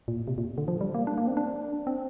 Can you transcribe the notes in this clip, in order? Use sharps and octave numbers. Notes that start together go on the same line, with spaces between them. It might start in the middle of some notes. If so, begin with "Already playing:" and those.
A#2
C3
A#2
D3
F3
G3
A#3
D4
A#3
C4
D4
C4